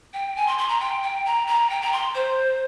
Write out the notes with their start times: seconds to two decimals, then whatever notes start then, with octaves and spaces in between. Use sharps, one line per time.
0.14 G5
0.36 G#5
0.47 C6
0.58 C6
0.69 A#5
0.80 G5
1.03 G5
1.26 A#5
1.47 A#5
1.70 G5
1.82 A#5
1.93 C6
2.15 C5